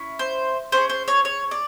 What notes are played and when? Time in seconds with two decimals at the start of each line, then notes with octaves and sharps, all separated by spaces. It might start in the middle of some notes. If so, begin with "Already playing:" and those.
Already playing: C#4 E4
0.19 C5
0.72 C#4 F4 C5
0.77 G#4
0.89 C5
1.08 C#5
1.25 C#5
1.51 D5